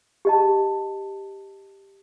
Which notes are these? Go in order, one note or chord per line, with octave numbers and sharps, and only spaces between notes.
G4 D#5 A5